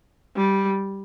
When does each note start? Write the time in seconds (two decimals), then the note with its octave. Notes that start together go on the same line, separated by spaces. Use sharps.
0.36 G3